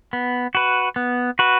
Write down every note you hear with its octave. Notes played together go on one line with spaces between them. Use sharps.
B3
F#4 B4
B3
F#4 B4